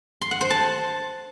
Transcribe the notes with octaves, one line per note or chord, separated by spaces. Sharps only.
C6
F#5
C5
A5